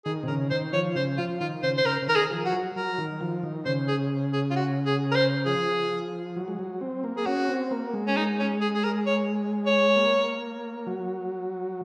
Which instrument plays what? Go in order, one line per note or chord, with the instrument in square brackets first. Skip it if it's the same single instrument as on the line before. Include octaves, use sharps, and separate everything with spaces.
[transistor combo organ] D#3 [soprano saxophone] G#4
[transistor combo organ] C3
[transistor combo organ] C#3 [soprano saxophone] A#4
[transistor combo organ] D#3 [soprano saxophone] C5
[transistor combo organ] F3 [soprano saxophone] C#5
[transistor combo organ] C#3 [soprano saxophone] C5
[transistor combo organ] F3 [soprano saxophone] F4
[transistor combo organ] D#3 [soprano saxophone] F4
[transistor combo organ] C#3 [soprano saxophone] C5
[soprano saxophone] C5
[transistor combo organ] C#3 [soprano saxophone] A#4
[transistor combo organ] C#3
[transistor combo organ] D#3 [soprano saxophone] A#4
[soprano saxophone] G#4
[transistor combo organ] F3
[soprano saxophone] F#4
[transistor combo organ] F#3
[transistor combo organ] F#3 [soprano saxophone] A#4
[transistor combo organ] D#3
F3
D#3
[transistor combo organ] C#3 [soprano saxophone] C5
[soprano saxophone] G#4
G#4
F4
F#4
G#4
A#4
C5
[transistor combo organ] F3 [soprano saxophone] G#4
[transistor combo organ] F#3
G#3
F#3
C4
A#3
[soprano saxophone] G#4
[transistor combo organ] C#4 [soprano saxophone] F#4
[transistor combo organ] C4
A#3
G#3
[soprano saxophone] C#4
D#4
C#4
G#4
G#4
A#4
C#5
C#5
[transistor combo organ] A#3
F#3